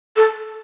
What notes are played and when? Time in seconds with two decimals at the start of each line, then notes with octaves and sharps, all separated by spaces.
0.16 A4